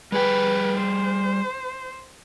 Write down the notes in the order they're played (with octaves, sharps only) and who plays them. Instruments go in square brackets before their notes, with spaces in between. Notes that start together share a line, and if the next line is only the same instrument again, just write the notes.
[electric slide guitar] G3 G#4 G5 [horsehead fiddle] B4
[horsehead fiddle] C5